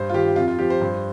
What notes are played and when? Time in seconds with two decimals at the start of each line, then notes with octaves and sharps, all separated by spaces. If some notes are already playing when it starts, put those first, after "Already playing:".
Already playing: G2 C5
0.09 F4
0.13 D#3 G4
0.36 F2 F4
0.48 F4
0.59 F3 G4
0.70 C5
0.81 G2